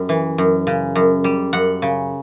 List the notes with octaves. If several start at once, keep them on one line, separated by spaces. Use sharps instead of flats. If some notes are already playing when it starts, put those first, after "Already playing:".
Already playing: F#2 G3
E3
F#2
C#3
F#2
G3
F#2 F#5
C#3